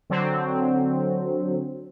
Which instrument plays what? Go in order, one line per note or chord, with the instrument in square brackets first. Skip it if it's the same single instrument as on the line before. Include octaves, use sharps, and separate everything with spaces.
[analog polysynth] D3 F#3 C4